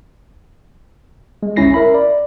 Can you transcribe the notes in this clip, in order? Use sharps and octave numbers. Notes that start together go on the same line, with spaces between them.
G#3
G1 C#2 C#4 E4 A#6 C7
A#4 E5 B5
D5